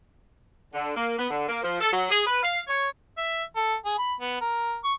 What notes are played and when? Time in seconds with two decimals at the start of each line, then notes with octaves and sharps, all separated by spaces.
0.74 D3
0.96 A#3
1.19 B3
1.31 D3
1.49 A#3
1.63 F3
1.80 A4
1.92 F#3
2.11 G#4
2.27 B4
2.43 F5
2.68 C#5
3.18 E5
3.56 A4
3.85 G#4
3.98 B5
4.21 B3
4.41 A#4
4.84 C#6